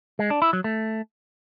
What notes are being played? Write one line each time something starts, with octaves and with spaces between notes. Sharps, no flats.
G#3
D4
E4
F#3
A3